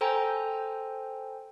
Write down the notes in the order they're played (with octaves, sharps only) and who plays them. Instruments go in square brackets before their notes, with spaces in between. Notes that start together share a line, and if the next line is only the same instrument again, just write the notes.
[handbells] A4 C5 G5 G#5 A#5